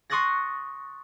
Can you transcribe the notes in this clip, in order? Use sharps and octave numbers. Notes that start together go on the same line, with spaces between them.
C6 C#6 D#6 F#6 A6 A#6